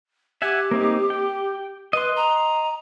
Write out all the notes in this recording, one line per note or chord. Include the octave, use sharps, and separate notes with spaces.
G4 E5 F#5 G#5
A#3 C4 D#4
G5
B4 D#5 C6
A#5